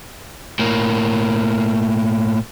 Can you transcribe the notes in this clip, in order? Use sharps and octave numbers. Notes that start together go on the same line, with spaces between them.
A2 A#3